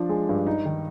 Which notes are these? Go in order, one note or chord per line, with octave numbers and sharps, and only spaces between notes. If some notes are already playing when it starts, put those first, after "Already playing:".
Already playing: F3 D4
G#3
G2
D#4
D#3